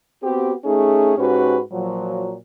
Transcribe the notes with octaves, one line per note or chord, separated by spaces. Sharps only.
B3 C4 F#4 G4
A3 C#4 D#4 G#4
G#2 C#4 F#4 G4 B4
A#2 F3 F#3